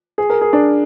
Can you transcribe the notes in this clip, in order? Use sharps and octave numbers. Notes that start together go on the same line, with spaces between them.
G#4
A#4
G#4
D4